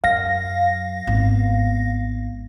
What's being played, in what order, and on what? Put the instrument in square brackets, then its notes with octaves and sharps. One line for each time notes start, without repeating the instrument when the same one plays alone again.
[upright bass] F#2 [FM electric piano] F5 A#6
[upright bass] G#1 B3